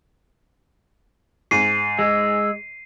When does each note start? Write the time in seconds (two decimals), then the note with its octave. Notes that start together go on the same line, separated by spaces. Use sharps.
1.51 G#2 C7 D#7
1.99 G#3 E6